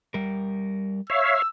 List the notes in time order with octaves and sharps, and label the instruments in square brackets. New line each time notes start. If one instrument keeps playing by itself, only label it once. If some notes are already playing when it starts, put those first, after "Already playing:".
[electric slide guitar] G3 A#4
[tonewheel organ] C#5 E5 F5 [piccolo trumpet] E6